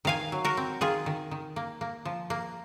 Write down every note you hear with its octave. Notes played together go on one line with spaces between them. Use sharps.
D#3 F5 G#5
F#3
F#4 A#4
C4
D#3 F4 G#4
D#3
D#3
A#3
A#3
F3
A#3